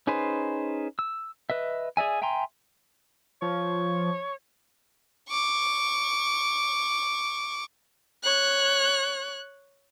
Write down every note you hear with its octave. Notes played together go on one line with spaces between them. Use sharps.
C#4 D#4 G#4 B4 C5
E6
B4 D#5 E5
G#4 D5 E5 G#5
E5 G5 G#5 A#5 C6
F3 C#5
C#6 D6
C#5 F#6